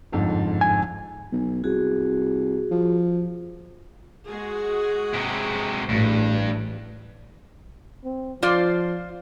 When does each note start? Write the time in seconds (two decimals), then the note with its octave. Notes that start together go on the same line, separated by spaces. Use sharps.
0.12 G1 F2 G#2
0.61 G#5
1.32 B1
1.64 C2 F#4 G#4
2.71 F3
4.28 G#3 F#4 G#4
5.14 G#2 C3
5.89 A1 G2
8.05 C4
8.43 F3 F4 C5 D5